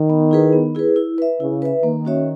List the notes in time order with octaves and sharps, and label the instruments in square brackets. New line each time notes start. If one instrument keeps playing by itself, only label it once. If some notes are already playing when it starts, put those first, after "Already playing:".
Already playing: [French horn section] D#3
[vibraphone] B3
E4 G#4 B4
B3
E4 G#4 B4
E4
B4 E5
[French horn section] C#3 [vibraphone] E4
[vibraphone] B4 E5
[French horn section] D#3 [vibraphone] A#3
[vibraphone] C#4 F#4 C#5 E5